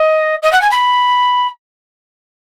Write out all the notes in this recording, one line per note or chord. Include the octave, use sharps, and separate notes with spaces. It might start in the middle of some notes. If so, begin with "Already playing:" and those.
Already playing: D#5
D#5
F#5
G#5
B5